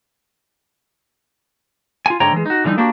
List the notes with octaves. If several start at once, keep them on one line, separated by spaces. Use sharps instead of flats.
F4 G#5
G#2 D3 C#5 D#5 G5 A#5
E3 G#3
D#4 F#4
D3 E3 G3 D4 D#4
A#3 D4 F#4 G4